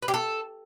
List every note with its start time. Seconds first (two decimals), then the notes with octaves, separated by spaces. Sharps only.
0.02 B4
0.08 G4
0.14 A4